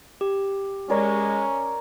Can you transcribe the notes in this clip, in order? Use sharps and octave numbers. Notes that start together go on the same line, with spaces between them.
G4
G#3 C#4 A#4 C#5 D5